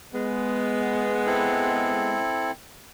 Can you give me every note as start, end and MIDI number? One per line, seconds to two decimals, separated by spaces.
0.14 2.18 56
0.14 2.18 59
1.27 2.51 60
1.27 2.51 64
1.27 2.51 69